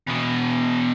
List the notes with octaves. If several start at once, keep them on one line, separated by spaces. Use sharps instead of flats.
E2 B2